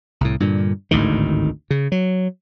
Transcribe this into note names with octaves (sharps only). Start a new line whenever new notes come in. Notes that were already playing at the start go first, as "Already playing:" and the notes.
C2 A2
G2 A#2 D3
G#1 D2 A2 D#3
C#3
F#3